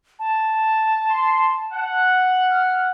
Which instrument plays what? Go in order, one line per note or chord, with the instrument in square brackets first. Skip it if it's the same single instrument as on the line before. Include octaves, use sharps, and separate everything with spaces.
[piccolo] A5
[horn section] C6
F#5
[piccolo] F6